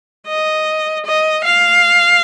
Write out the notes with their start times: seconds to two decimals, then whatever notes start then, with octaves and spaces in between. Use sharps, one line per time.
0.27 D#5
1.06 D#5
1.45 F5